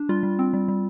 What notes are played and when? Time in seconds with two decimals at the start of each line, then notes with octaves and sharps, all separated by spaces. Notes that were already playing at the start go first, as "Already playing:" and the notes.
Already playing: D4
0.09 G3 F4
0.23 G3
0.39 C4
0.53 G3
0.68 G3